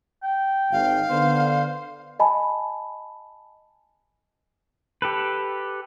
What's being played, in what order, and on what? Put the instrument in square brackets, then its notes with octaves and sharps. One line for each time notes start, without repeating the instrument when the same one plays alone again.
[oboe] G5
[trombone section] G#1 [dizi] F5
[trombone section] D3 B3 [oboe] C5
[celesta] D#5 G#5 A5 B5
[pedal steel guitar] G4 A4 B4